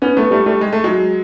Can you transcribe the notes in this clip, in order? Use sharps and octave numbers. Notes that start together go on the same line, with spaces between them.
B3 C#4
A3 B3
G3 A3
G3 A3
G#3
A3
F#3 G#3